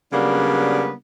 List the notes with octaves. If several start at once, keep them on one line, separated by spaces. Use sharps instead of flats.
C#3 F#3 G3 A#3 B3 D4